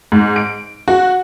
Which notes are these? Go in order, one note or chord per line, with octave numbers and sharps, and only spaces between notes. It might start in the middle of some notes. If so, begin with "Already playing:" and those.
G#2
D7
F#4